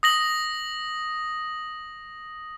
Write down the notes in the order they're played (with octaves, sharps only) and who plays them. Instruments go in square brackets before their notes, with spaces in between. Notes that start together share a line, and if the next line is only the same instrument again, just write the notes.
[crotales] D#6 A#6 F#7